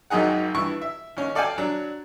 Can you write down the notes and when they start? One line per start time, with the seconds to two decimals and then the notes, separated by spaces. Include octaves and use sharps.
0.10 G#1 F#2 D#3 D#4 G#4 F#5
0.55 G2 E3 E4 C#6
0.82 E5
1.17 D#2 C#4
1.35 A4 D5 F5 G5 G#5
1.58 F#3 D4